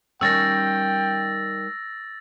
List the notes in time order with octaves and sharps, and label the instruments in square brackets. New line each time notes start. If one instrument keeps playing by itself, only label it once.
[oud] D#3 G3 C#4 [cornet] G5 [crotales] E6 A6 A#6